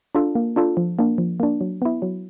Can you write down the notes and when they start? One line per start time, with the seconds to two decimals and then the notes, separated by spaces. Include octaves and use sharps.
0.15 D4 F4 A4
0.35 A#3
0.56 D4 F4 A4
0.77 F3
0.99 A#3 D4
1.18 F3
1.40 A#3 D4
1.61 F#3
1.82 B3 E4
2.02 F#3